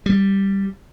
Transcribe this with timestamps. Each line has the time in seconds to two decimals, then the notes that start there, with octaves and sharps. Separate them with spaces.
0.06 G3